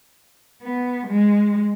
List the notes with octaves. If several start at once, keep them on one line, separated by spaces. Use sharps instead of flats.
B3
G#3